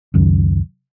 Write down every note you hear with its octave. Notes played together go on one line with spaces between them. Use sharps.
C#2 F#2 D#3